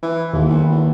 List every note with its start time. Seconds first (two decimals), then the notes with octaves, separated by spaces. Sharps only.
0.03 E3
0.33 D#2 G#2
0.49 B1
0.72 E2